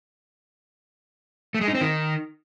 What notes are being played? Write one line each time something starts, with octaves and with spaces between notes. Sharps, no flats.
A3
G#3
D#4
C4
D#3